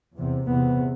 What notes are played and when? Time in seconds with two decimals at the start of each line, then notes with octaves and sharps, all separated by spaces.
0.18 E2 C3
0.49 E2 C3 B3